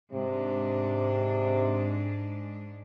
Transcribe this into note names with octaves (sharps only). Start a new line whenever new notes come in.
G#2 C3 G#3 D4